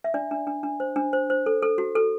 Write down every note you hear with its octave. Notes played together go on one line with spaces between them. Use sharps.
E5
D4 D5
D4
D4
D4
C5
D4
C5
C5
A4
A4
F#4
A4